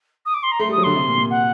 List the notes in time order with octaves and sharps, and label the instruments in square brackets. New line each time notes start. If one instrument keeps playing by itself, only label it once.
[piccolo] D#6
D6
C6
A#5
[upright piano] A3 [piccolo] C6
[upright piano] G3 [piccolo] D#6
[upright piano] F#3
[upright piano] D3 [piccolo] C6
[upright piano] C3
A#2
A#2
[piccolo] F#5